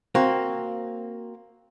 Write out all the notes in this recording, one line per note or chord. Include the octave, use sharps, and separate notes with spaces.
A#3 C4 F#4